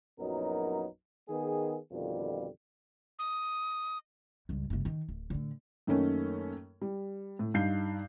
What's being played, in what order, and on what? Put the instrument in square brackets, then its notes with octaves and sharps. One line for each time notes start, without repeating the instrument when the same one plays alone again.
[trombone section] A#1 F#2 F#3 B3 D#4 A#4
D#3 B3 G#4
F2 B2 D3 D#3 G3 F4
[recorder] D#6
[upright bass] C#2 G2
F#1 C2
D#3
D1
A2 D3
[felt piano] F#2 D#3 A3 A#3 C#4
G3
A2
G2 D#4 F5 G6 C7